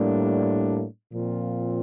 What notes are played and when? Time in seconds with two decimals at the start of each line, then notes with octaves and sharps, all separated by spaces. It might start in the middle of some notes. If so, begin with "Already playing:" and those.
Already playing: A2 G3 A#3 D4
1.12 A#2 F3 C4 F4